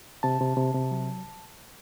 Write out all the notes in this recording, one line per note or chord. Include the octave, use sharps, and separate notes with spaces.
C3 A5
C3
C3
C3
F#3